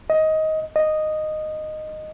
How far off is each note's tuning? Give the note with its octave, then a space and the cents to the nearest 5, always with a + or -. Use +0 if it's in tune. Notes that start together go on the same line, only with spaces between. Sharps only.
D#5 +15
D#5 -10